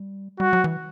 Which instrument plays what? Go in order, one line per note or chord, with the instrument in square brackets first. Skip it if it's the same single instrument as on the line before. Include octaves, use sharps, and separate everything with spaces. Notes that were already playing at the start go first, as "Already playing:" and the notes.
Already playing: [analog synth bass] G3
[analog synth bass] G3 [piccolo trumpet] F#4
[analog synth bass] F#3
E3